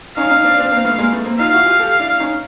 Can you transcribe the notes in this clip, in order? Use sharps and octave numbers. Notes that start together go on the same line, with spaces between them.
C#4 D#4 F5
C#4 D#4
C4 D4
C4 D4
A#3 C4
A3 B3
G#3 A#3
A3 B3
A#3 C4
D#4 F4 F5
E4 F#4
F4 G4
G4 A4
D4 E4
C#4 D#4